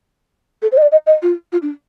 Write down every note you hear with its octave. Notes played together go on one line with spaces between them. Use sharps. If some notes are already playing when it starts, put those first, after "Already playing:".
A4
C5
D#5
D5
D#5
D#5
F4
F4
D4